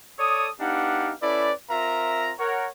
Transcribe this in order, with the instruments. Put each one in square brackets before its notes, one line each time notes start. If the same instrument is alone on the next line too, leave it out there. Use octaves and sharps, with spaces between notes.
[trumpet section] A4 C#5 D5 D#6
B3 D4 D#4 G4 F5 F#5
C#4 E4 A4 B4 D5
C4 F4 A#4 E5 A#5
A#4 C#5 F#5